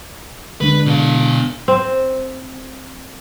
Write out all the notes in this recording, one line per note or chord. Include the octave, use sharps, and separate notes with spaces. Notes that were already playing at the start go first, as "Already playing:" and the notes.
D3 G#3 D4 B4
B2 F5
C4